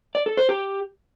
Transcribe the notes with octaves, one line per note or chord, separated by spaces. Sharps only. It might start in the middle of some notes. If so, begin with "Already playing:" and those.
D5
A4
C5
G4